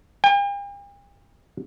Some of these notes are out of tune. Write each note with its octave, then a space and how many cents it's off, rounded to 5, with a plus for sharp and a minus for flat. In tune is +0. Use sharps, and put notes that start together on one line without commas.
G5 +45